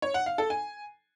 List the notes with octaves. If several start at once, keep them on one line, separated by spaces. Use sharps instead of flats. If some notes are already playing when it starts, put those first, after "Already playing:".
C#5
F#5
F5
A4
G#5